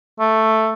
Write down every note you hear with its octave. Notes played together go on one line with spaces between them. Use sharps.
A3